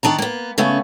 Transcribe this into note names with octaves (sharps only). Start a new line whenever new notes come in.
D#3 D4 A5 A#5
A#3 B3
C#3 A3 B3 C#4